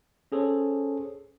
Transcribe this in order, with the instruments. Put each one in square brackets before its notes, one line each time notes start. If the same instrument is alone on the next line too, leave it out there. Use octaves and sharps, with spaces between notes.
[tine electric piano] C#4 G#4 A4 C5 C#5